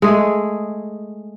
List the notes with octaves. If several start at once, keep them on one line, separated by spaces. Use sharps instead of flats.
G#3 A3 G#4